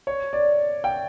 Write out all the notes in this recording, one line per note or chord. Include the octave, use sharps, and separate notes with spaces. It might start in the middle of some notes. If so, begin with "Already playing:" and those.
C#5
D5
G5